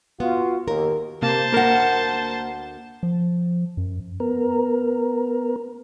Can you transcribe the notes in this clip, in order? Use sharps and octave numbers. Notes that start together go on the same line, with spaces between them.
B3 F4 F#4
D#2 A#4
C3 A#3 C5 A5
D2 A#3 A#4 F#5
F3
F#2
B3 A#4